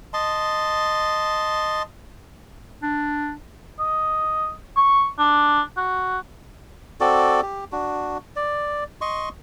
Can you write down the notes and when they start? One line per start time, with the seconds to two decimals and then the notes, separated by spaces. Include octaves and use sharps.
0.14 D#5 A5 C6
2.82 D4
3.79 D#5
4.77 C#6
5.19 D4
5.77 F#4
7.00 C4 F#4 A4 D5
7.42 G4
7.72 D4 F#4
8.36 D5
9.01 D#5 C6 C#6